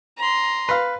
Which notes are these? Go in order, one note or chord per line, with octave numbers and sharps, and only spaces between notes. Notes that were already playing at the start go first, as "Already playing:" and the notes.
A#5 C6
B4 F5